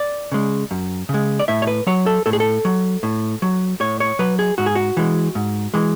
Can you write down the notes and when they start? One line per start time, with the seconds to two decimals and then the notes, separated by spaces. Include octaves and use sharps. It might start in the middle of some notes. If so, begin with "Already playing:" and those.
Already playing: D5
0.32 C#3 G#3
0.71 F#2
1.09 C#3
1.14 G#3
1.39 D5
1.48 A2 E5
1.62 C#5
1.67 B4
1.87 F#3 C#5
2.06 A4
2.26 A2 A4
2.33 G#4
2.40 A4
2.65 F#3
3.03 A2
3.42 F#3
3.80 A2 C#5
4.00 C#5
4.19 F#3 B4
4.39 G#4
4.58 G#2 F#4
4.66 G#4
4.75 F#4
4.97 E3 G#3
5.35 G#2
5.74 E3 G#3